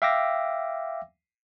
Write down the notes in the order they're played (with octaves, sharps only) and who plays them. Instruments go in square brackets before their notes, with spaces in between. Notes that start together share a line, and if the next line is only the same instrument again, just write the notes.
[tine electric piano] E5 F5 G5 D6 E6 A#6